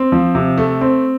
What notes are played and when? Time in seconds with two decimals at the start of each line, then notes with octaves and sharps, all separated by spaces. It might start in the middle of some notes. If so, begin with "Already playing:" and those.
Already playing: C4
0.12 F3
0.35 C3
0.58 A3
0.81 C4